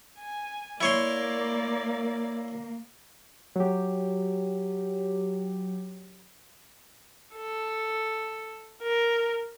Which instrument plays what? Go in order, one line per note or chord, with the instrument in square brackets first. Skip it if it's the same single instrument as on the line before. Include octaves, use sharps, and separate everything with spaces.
[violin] G#5
[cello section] A#3 [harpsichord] E4 C#5 C6 [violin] D5
[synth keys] F#3 G4
[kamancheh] A4
A#4